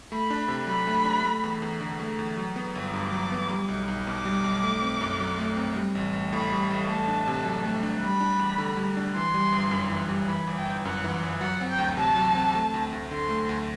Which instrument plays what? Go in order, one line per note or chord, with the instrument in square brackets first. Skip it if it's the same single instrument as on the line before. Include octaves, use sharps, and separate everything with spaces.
[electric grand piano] A3 [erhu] B5
[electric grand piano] D4
C3
[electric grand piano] F#3 [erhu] B5
[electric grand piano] A3
D4
A3
E2
E2
D3
A3
E2
F#3
B3
G1
[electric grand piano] G2 [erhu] D6
[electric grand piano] F#3
B3
G3
B1
B1
[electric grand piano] B2 [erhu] D6
[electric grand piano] G3
B1
A3
C4
F#2
F#3
A3
C4
G3
A1
A1
[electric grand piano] A2 [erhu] B5
[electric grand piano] G3
A1
[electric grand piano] A3 [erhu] A5
[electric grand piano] D4
C3
F#3
A3
D4
[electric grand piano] G3 [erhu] B5
[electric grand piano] D4
E2
D3
G3
D4
[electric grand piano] E3 [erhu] C6
[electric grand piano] G3
G1
F#2
E3
G3
[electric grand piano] E3 [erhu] B5
[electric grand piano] G1
[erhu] G5
[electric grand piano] G1
[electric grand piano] F#2 [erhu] F#5
[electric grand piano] E3
G1
[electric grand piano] F#3 [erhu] F#5
[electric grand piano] C4
[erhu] G5
[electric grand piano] D2
[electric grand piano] C3 [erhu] A5
[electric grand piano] F#3
C4
A3
D2
D2
[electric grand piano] D3 [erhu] C6
[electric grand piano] A3
D2